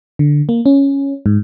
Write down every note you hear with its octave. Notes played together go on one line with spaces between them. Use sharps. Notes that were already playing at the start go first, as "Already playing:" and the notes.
D3
A#3
C#4
G#2